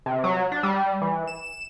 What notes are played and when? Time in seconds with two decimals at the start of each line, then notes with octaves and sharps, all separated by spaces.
0.06 C3
0.24 F#3
0.52 D4
0.63 G3
1.02 E3
1.28 E7